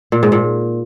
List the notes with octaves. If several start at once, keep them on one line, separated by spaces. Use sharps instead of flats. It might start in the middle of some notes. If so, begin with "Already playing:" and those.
A#2
G#2
A#2